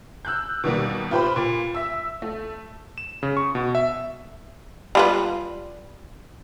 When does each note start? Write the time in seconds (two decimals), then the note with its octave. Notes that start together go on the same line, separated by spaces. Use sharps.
0.25 E6 F#6 G6
0.64 B2 D#3 G3 A#3
1.11 F4 G4 B4 C5 G5 B5
1.36 A#2
1.75 E5 E6
2.22 A3
2.98 E7
3.23 C#3
3.37 C#6
3.55 B2
3.75 E5
4.95 G3 F4 B4